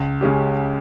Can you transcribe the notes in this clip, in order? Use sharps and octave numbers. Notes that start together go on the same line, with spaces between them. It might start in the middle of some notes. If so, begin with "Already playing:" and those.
Already playing: C#2
C#3 G#3 C#4 G4